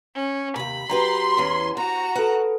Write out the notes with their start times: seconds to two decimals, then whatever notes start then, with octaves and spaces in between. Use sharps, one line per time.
0.14 C#4
0.56 D#2 C3 B5
0.90 F#3 G4 B4 A#5 C6
1.37 E2 E3 C#4
1.77 C4 F#4 A#5
2.15 A4 B4 F#5